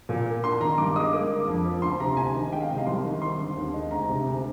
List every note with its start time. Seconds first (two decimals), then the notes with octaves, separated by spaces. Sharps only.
0.09 A#2
0.26 A#3
0.43 D4 C6
0.61 D#3 A#5
0.78 G2 D6
0.96 G#3 D#6
1.13 A#3 D6
1.30 D3
1.48 F2
1.65 F3
1.82 D2 C6
2.00 C3 A#5
2.17 D2 G#5
2.35 D#3
2.52 G#3 G5
2.60 F5
2.69 C3 D#5
2.78 F5
2.87 C2 C6
3.05 D#3
3.22 C4 C6
3.39 D3
3.57 D#2
3.74 G#3
3.91 D2 A#5
4.09 C3
4.26 D2